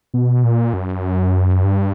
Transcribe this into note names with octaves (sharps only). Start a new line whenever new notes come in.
B2
A#2
F#2
G2